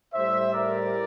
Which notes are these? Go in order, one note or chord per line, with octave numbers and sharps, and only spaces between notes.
A2 G3 C5 E5
A#4 D5